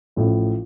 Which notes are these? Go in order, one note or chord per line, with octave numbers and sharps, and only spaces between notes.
A1 A2 F3 F4